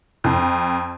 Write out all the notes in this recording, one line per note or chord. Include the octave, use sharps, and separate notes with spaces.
F2